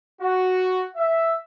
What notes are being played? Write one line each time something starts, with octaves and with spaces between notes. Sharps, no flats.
F#4
E5